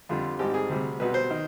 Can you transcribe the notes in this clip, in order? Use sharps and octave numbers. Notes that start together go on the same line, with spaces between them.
F2 D3 G3 F4
G#1 G#2 G3 G4
G#4
D2 C3 G3
B1 B2 G3 B4
C5
D#3